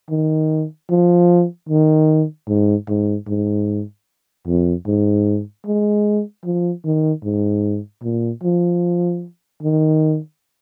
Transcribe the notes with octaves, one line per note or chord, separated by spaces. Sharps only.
D#3
F3
D#3
G#2
G#2
G#2
F2
G#2
G#3
F3
D#3
G#2
A#2
F3
D#3